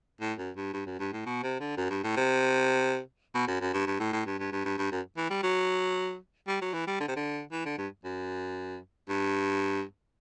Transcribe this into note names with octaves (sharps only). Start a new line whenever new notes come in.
A2
F#2
G2
G2
F#2
G2
A2
B2
C3
D3
F#2
G2
A2
C3
B2
F#2
F#2
G2
G2
A2
A2
G2
G2
G2
G2
G2
F#2
E3
G3
F#3
G3
F#3
E3
G3
D3
C3
D3
E3
D3
G2
F#2
G2